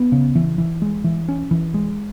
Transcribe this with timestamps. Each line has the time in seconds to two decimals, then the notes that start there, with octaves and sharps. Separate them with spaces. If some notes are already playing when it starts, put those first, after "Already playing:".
Already playing: B3
0.12 C#3
0.35 E3
0.58 E3
0.82 G#3
1.04 E3
1.29 C#4
1.51 E3
1.74 G#3